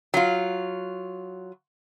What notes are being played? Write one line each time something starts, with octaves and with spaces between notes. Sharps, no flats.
F#3 F4